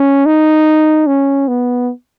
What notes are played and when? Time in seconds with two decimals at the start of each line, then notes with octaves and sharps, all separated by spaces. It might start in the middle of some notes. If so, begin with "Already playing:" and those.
Already playing: C#4
0.26 D#4
1.07 C#4
1.48 B3